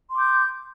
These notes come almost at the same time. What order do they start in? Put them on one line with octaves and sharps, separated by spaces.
C6 D6 G6